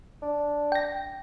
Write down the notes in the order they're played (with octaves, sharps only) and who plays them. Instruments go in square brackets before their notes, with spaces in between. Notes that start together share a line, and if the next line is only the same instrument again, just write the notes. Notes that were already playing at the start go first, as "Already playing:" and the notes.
[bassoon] D4
[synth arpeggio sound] G5 A#6